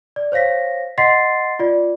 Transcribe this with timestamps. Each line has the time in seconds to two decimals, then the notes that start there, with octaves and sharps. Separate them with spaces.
0.16 D5
0.32 C5 C#5 F5 A#6 B6
0.98 D#5 F#5 C6 A6 B6 C7
1.59 F4 D5